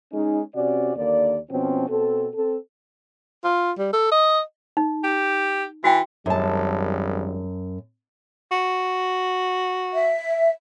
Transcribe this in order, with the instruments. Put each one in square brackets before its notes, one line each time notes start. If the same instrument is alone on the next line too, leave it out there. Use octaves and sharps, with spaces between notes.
[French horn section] G#3 C#4 D#4
C3 C#4 F#4 D5
D#2 D3 A#3 D5
B2 F3 C4 C#4
B2 C4 A4
C4 A4
[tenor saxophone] F4
G3
A4
D#5
[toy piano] D#4
[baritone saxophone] G4
[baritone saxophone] E3 [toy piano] F#4 G5
[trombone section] G#1 G3 [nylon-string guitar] F#2 A5
[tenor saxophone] F#4
[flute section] E5